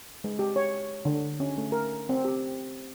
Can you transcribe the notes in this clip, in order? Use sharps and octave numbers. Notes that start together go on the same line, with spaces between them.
G#3
G4
C#5
D3
C#4
A3
A#4
C4
G4